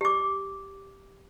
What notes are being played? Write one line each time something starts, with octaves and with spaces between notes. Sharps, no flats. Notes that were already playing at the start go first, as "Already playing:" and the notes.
G4 D6